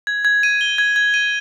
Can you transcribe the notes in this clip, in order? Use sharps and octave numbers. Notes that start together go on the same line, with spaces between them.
G#6
G#6
D#7
G7
G#6
G#6
D#7